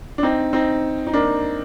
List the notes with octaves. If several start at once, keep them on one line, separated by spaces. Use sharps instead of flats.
D4
C4 D#4
C4 D#4
D#4
A#3 D4